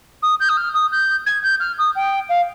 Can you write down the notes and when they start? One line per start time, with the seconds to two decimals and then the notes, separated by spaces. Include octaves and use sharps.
0.22 D#6
0.39 G6
0.49 D#6
0.57 F6
0.74 D#6
0.91 G6
1.26 G#6
1.43 G6
1.60 F6
1.78 D#6
1.95 G5
2.29 F5